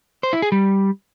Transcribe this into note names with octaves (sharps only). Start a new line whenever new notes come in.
C5
E4
G#4
G3